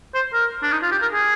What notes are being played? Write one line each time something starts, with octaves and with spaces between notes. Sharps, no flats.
C5
A#4
D4
D#4
F4
G4
A#4
G#4